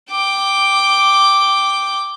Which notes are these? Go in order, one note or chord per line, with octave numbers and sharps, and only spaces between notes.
G5 D6